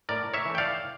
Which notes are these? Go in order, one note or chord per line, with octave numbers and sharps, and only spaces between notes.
A2 A#4 D5
C#5 E5
E3 A3
G5
D5 F5